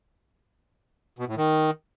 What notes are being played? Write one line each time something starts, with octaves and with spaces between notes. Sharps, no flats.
B2
A2
D#3